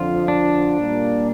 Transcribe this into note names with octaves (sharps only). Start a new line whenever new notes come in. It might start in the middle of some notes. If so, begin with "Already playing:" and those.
Already playing: F2 D3 F3 F4
D4
A#2 G3 A#3